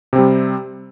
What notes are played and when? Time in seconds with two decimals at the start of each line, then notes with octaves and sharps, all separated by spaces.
0.13 C3
0.16 C4
0.18 G3